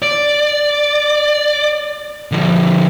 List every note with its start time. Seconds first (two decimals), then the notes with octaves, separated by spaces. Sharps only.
0.02 D5
2.32 D3 F3